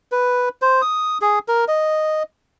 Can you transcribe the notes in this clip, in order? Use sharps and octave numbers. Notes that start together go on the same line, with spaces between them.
B4
C5
D#6
G#4
A#4
D#5